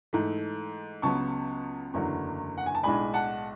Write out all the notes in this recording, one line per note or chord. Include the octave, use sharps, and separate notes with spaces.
G#2 E3 A3
C#2 C#3 F#3 B3 A5 C#6
F#1 E2 D3 F#3
F#5
G#5
A5
B1 A2 G#3 D4 G#5 B5
F#5 A5